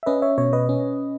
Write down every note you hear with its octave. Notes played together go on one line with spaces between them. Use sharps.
E5
C#4 B4 D#5
C#5 E5
B2 C#5
B4 D#5
C#4